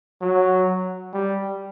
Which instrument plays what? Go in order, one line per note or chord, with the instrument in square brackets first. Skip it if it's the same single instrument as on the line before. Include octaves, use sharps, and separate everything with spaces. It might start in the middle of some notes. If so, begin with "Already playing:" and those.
[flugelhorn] F#3
G3